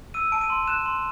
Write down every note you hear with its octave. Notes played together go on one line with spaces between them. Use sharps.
E6 D#7
A5 D7
D#7
C6
F#6 E7
C6